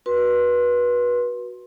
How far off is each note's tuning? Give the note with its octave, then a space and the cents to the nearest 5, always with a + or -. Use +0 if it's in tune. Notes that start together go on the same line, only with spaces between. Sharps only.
F#4 +0 B4 -25 C6 +15